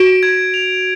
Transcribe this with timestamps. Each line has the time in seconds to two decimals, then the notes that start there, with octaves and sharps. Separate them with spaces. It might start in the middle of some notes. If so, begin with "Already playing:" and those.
Already playing: F#4 D7
0.23 G#6
0.54 F7